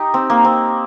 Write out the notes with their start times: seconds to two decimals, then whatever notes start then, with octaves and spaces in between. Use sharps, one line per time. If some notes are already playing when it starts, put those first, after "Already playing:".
Already playing: D#4 G4
0.14 C4
0.30 A#3
0.45 C4